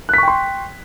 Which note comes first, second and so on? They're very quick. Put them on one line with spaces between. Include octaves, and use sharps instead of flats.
F#6 B6 C#6 G5 C6